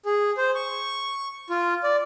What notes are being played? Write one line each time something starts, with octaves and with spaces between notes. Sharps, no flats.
G#4
C5
C#6
F4
D5